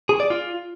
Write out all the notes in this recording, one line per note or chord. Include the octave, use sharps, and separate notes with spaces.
G#4
D5
F4